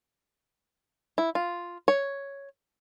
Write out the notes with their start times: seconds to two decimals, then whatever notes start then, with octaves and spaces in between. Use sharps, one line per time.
1.18 E4
1.35 F4
1.88 C#5